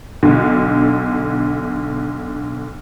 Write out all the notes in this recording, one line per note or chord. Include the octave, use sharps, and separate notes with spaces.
B1 D3